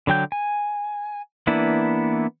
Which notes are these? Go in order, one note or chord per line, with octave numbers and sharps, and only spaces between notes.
D3 F#3 G5 G6
G#5
E3 A#3 B3 D4 E4